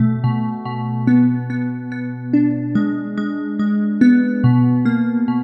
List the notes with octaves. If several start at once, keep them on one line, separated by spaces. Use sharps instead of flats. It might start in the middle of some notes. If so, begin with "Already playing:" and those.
Already playing: B2 A3
B2
B2
B3
B3
B3
D4
G#3
G#3
G#3
B3
B2
A#3
B2